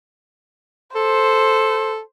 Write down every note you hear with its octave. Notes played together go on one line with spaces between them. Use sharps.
A4 C5